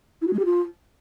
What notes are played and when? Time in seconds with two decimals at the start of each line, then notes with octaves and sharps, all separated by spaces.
0.21 E4
0.27 F#4
0.33 G#3
0.39 G4
0.45 F4